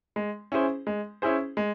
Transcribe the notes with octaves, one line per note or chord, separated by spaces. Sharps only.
G#3
C#4 E4 G#4 C5
G#3
C#4 E4 G#4 C5
G#3